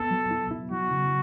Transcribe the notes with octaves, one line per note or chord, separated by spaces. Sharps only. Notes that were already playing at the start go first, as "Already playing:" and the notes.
Already playing: B3 A4
F#3
E4
E4
F#3 F#4
C#3